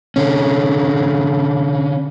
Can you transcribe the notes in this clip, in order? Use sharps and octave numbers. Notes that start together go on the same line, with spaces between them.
D3 C#4